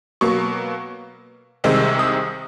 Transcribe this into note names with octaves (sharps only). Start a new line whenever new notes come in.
B2 F#3 A#3 C#6
C2 C3 D#3 G#3 C4
D#6